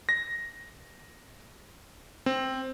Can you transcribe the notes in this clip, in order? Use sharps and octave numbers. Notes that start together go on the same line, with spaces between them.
A#6
C4